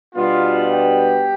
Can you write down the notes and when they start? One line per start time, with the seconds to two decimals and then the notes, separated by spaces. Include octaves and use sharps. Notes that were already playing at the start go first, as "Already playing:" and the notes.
0.15 B2 G3 B3 D4 F4
0.71 G4